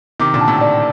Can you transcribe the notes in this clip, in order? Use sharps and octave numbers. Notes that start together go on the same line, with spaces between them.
C3 D#3 D6
A#2 D3
A5
A2 C3
D5